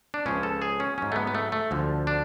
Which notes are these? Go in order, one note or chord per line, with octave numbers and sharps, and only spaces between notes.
D4
C#2 C#3 F3 C#4
A4
G#4
C#4
G#2 F#3 C#4
A3
B3
B3
A3
A3
D2 D3 F3
D4